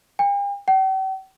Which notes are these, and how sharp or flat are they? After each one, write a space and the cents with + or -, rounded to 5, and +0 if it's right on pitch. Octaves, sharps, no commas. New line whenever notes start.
G5 +45
G5 -45